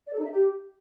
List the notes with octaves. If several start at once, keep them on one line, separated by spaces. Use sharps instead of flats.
D5
A4
D#4
E5
G4